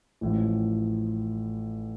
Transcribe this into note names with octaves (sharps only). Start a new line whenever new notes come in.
A1 A2 F3